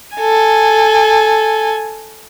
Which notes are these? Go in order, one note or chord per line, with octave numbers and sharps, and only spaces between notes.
A4 G#5